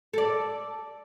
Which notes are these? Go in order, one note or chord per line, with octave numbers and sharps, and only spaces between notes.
A4 D5